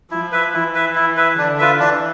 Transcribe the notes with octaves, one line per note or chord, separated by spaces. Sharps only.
F3 E4
B4 E5
E3 E4
B4 E5
E4
B4 E5
D3 D4
F4 B4 E5
E3 D4